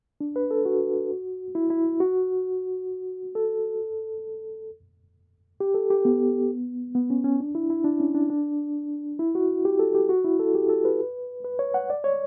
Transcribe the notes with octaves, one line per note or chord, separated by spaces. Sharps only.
D4
B4
A4
F#4
E4
E4
F#4
A4
G4
A4
G4
B3
B3
C#4
C#4
D4
E4
E4
D4
C#4
D4
D4
E4
F#4
G4
A4
G4
F#4
E4
A4
G4
A4
B4
B4
C#5
F#5
D5
C#5